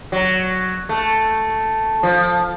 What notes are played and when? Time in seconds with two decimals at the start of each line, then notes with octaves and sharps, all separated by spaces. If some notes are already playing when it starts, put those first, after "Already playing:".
0.12 F#3
0.89 A3
2.03 F3